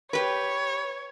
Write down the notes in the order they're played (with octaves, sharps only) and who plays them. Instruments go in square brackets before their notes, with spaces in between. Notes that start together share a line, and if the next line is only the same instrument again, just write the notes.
[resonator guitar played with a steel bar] G4 B4 [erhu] C#5